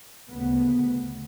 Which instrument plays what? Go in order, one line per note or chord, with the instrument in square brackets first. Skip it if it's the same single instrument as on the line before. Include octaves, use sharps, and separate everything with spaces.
[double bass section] D2 C#3 B3